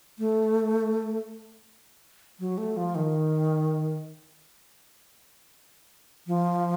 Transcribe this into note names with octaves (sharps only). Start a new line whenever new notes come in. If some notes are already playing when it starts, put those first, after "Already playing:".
A3
F#3
A3
F3
D#3
F3